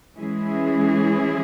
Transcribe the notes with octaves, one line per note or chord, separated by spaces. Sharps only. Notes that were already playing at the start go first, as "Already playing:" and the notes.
E3 G#3 C#4 E4 G#4